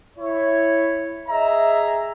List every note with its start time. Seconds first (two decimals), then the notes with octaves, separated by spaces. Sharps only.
0.17 E4 C#5
1.28 G#4 D#5 E5 A#5